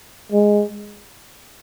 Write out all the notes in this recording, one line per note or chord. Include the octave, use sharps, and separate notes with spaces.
G#3